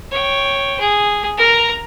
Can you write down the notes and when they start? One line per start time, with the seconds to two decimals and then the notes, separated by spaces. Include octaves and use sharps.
0.11 C#5 G5
0.80 G#4
1.38 A#4 A#5